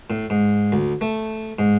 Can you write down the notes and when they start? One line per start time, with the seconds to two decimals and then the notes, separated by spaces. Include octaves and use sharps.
0.10 A2
0.30 G#2
0.72 D2
1.01 A3
1.59 G#2